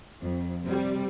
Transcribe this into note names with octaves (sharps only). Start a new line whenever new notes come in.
F2
C3 G3